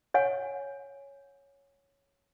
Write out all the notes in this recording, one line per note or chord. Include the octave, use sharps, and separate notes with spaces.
C#5 F#5 G#5